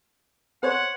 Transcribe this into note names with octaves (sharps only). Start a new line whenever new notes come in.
C5 C#5 F#5